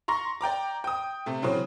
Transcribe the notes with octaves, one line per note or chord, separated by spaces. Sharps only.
A#5 C6 C#6 A#6
D5 G5 A#5 D6
G5 D#6
C3 A3
C#3 E3 F#3 C4